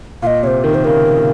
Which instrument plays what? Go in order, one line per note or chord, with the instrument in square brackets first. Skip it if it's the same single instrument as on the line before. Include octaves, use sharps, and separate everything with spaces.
[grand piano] A#2 [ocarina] F5
[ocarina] D#5
[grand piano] C3 [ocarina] C#5
[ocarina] C5
[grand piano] D#3 [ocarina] A#4
[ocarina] C5
[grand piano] C#3 [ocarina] A#4
[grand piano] A#2